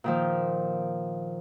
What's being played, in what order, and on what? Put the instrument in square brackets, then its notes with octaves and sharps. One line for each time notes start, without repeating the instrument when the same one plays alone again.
[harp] A#2 D#3 F3